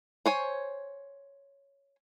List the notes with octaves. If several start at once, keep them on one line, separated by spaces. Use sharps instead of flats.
C5 C#5 G#5